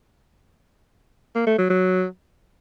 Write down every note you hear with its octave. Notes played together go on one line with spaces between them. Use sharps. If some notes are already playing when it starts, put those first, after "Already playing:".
A#3
A3
F#3
F#3